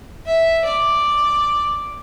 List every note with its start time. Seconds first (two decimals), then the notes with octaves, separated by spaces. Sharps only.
0.26 E5
0.64 D5